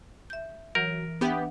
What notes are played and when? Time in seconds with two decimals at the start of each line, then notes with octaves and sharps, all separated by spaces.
0.30 E5 G6
0.75 E3 F#3 A#4
1.21 B3 D4 G4 E5 F#5